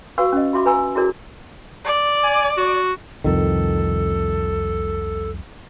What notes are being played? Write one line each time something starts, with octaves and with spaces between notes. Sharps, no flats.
F#4 B4 F5 F#5 C#6 E6
C#4 D#5
F4 F#4 E5 C6 D6
B4 G#5 A#5 E6
E4 F#4 G#4 A#4 C#5
D5
G#5
F#4
C2 F2 D#3 A4